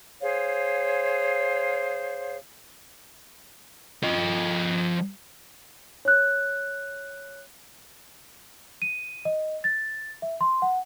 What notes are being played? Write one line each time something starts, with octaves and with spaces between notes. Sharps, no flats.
G#4 C5 C#5 F5
F3 D#5
C#5 F#6
D#7
D#5
A6
E5
C6
F#5